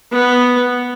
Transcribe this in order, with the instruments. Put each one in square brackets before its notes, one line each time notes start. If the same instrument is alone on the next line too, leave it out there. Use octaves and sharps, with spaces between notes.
[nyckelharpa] B3